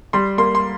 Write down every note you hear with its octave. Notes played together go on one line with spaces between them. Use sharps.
G3 C6
A#3 C6
C6